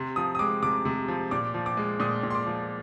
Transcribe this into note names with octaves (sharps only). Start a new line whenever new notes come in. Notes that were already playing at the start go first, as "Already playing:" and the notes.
Already playing: C3 C6
F3 D#6
D#6
G#3 D6
C3 D6
C3
F3
A#2 D6
F3
D6
G#3
A#2 D#6
A#2
C6
D6
F3